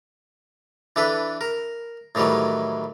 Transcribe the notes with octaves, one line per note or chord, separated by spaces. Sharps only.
E3 D4 A4 B4
A#4
A2 D#3 E3 F#3 G3